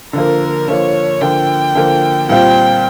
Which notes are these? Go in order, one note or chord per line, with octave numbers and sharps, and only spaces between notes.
D3 F3 A#3 A#4
D3 F3 A#3 C#5
D3 F3 A#3 G5
D3 F3 A#3
A#2 G3 C4 F4 G5